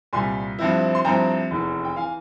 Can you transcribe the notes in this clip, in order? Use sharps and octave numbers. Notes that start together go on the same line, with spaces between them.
C2 A#2 G3 G#5 C6
G2 F3 C4 E4
C6
G2 F3 C4 E4 G5 A#5
F1 E2 E3
G5
E3 F5 G#5